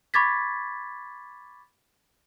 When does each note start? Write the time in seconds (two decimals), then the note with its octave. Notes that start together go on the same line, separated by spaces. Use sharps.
0.14 B5 C#6 D6 G#6 A6 B6